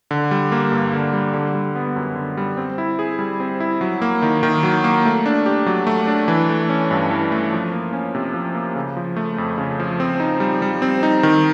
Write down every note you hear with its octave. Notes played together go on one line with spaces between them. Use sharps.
D3
G3
A#3
G2
D3
G3
D3
G3
B3
F#2
D3
G3
C4
E4
G#4
G3
C4
E4
F#3
A#3
D#3
D#3
F#3
A#3
A3
D4
G4
F#3
A3
D4
E3
A3
C#4
G2
E3
A3
F3
A#3
C#4
C3
F3
A#3
C#3
F3
A3
F2
C#3
F3
C4
D#4
G3
G3
C4
D#4
D#3